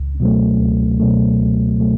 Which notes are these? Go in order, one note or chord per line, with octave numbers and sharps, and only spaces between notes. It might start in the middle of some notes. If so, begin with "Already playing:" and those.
Already playing: C#2
B2 F#3 A3
C#2
B2 F#3 A3
C#2
B2 F#3 A3